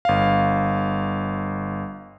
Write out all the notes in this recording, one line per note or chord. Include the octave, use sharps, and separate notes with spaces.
G1 F5